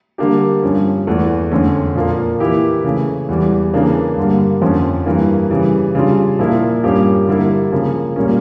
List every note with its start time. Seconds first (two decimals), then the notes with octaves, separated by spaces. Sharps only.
0.18 D3 G3 A#3 D4 G4
0.63 G2 F3 C#4
1.07 E2 E3 A3
1.52 F2 D3 A3 C#4
1.95 A#2 F3 A#3
2.40 E3 A#3 E4 G4
2.84 C#3 E3 A3
3.28 E2 E3 G3
3.73 C#3 E3 A#3 D4
4.17 G2 D3 G3 A#3
4.61 F2 D3 F3 C#4
5.06 G2 E3 A#3
5.50 C#3 E3 G3
5.95 C#3 G3 D4 F4
6.39 A#2 F3 A#3 E4
6.84 G2 F3 A#3 C#4 G4
7.27 D3 G3 A#3 E4
7.72 C#3 F3 A#3
8.16 A#2 G3 A#3 C#4